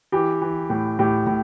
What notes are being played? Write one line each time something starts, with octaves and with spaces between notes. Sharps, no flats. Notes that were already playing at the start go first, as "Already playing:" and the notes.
E3 G4
E3
A2
A2 G4
A2